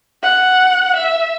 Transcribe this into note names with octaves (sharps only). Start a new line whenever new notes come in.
F#5
E5